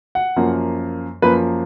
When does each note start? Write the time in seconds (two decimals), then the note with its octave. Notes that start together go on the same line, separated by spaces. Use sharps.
0.15 F#5
0.36 F#2 F3 A#3
1.22 F#2 F3 A#3 B4